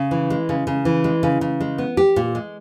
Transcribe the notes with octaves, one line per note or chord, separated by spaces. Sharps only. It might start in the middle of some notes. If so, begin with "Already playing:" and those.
Already playing: C#3
E3
G#3
C#3
C#3
E3
G#3
C#3
C#3
G#3
B3
G4
A#2
G#3